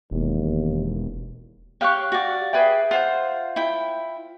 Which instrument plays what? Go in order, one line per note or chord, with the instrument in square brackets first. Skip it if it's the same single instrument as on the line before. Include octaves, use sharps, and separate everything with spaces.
[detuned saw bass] E1 [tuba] D#2
[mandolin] G4 F5 F#6 [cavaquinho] C#5 C#6
[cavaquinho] F#4 D5
[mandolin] G#4 B4 G5 [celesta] E5
[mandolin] F4 C5 G6 [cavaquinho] F#5
[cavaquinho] E4 G5